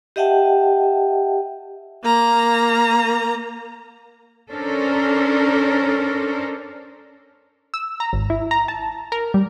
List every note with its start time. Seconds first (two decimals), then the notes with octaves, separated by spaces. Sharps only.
0.16 G4 D#5 E5 F#5 G5 A5
2.04 A#3 A#5
4.51 C#4 D4 A4 A#4 C5
7.74 E6
8.00 A#5
8.13 G#1
8.30 E4
8.51 A#5
8.68 A5
9.12 A#4
9.34 G3